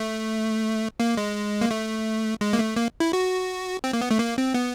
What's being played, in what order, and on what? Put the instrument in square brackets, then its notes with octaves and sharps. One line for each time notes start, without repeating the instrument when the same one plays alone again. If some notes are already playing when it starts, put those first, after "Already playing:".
Already playing: [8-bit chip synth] A3
A#3
G#3
A#3
A3
G#3
A#3
A3
A#3
E4
F#4
C4
A#3
B3
A3
A#3
C4
B3